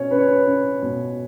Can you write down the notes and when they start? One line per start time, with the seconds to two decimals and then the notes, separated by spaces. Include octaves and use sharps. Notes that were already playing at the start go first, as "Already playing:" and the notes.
Already playing: B2 C#4 C#5
0.11 C#4 B4
0.19 C#5
0.27 B4
0.47 C#4
0.82 B2